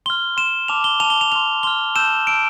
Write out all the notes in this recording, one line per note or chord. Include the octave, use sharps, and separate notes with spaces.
C6 F6 G7
C6 F6 E7
A5 D6 F6 F7
G7
A5 D6 F6 F7
G7
F7
C6 F6 F7
C6 F6 G7
A5 E6 G6 E7
A5 E6 G6 D7